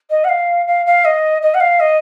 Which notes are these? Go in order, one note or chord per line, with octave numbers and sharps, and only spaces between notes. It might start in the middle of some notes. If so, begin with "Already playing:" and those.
D#5
F#5
F5
F5
F5
D#5
D#5
F#5
F5
D#5